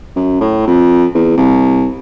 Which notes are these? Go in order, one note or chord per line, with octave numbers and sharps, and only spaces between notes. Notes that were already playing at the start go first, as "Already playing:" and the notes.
F#2
A2
F2
E2
C2